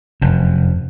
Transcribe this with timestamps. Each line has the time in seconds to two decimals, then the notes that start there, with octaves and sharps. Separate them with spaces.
0.22 F1 F#2